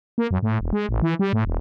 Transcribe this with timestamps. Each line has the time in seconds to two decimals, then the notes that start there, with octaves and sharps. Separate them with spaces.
0.18 A#3
0.31 F#2
0.43 A2
0.61 E1
0.73 G#3
0.89 A1
1.02 E3
1.19 G3
1.33 A2
1.45 E1